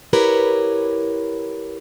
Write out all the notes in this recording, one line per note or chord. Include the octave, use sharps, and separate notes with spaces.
E4 G4 A#4 B4 C#5